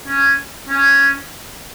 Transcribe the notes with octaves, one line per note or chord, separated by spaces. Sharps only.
C#4
C#4